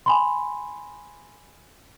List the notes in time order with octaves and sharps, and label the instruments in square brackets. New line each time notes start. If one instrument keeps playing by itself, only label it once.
[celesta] G#5 B5 C6